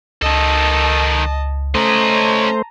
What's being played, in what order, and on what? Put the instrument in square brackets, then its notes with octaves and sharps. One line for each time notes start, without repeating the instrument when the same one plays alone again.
[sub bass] C#2 [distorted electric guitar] D#3 A4 [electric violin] D#5 A5
[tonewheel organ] A3 C5 [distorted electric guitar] C#4 D#5 [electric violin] A5 A#5